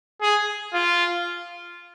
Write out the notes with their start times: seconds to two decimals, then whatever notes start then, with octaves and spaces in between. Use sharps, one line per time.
0.21 G#4
0.74 F4